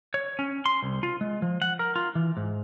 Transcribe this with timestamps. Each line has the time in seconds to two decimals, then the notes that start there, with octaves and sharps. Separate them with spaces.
0.14 C#5
0.39 C#4
0.66 C6
0.83 C2
1.03 F4
1.21 G#3
1.42 F3
1.62 F#5
1.79 A#4
1.96 F4
2.15 E3
2.37 G#2